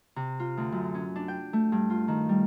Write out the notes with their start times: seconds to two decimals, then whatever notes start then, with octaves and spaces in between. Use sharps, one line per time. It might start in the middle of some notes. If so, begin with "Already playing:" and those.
0.16 C3
0.40 F4
0.57 D2
0.72 F#2
0.94 C#4
1.16 D4
1.28 G5
1.53 A3
1.72 G2
1.90 F4
2.08 D#3
2.29 G3